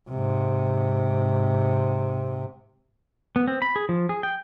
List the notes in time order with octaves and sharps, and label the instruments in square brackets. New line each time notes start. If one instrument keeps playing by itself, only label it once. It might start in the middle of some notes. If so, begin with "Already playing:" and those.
[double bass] G#2 C3
[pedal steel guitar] B3
C4
B5
G#4
F3
G#4
G5